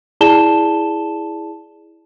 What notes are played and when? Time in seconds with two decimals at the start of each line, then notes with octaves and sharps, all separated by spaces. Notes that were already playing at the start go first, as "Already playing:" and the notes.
0.21 E4 G#4 D5 A5 E7 G7